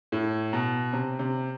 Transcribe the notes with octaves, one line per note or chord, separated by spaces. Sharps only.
A2
B2
C3
C3